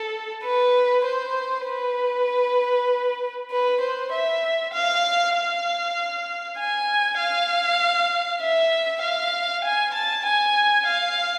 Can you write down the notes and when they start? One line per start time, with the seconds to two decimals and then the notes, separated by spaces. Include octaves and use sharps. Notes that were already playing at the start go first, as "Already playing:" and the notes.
Already playing: A4
0.44 B4
1.05 C5
1.66 B4
3.51 B4
3.81 C5
4.12 E5
4.73 F5
5.34 F5
6.58 G#5
7.18 F5
8.41 E5
9.02 F5
9.64 G#5
9.94 A5
10.25 G#5
10.86 F5